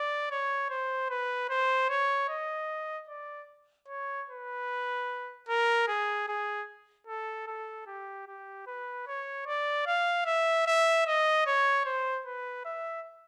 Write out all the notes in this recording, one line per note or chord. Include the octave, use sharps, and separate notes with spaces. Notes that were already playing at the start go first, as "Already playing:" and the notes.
Already playing: D5
C#5
C5
B4
C5
C#5
D#5
D5
C#5
B4
A#4
G#4
G#4
A4
A4
G4
G4
B4
C#5
D5
F5
E5
E5
D#5
C#5
C5
B4
E5